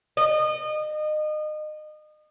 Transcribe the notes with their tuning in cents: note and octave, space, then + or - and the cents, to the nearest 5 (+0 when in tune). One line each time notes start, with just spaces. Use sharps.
D#5 -30